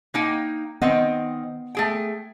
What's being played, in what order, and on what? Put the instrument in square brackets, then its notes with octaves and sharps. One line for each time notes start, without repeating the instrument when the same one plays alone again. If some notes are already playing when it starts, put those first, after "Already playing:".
[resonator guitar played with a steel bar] A#3 D#4 G5
[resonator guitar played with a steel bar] D#3 C4 D#5 [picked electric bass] B3
[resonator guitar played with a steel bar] A3 G#4 G5